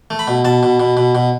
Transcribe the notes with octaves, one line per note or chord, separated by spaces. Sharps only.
A3
B5
B2
B2 A5
B2
B2
B2
B2